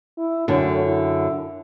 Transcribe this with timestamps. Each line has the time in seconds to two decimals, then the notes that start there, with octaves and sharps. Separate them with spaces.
0.18 E4
0.48 F#2 A2 D3
0.86 E4